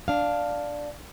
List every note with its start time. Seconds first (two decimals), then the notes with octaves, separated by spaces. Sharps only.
0.08 D4 F5